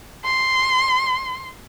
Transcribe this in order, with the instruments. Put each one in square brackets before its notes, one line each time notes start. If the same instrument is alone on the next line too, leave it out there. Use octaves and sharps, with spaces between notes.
[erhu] C6